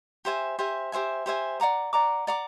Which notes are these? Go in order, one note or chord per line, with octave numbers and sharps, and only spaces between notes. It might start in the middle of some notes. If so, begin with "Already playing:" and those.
G4 C5 E5 G#5
G4 C5 E5 G#5
G4 C5 E5 G#5
G4 C5 E5 G#5
D5 F#5 A#5 D6
D5 F#5 A#5 D6
D5 F#5 A#5 D6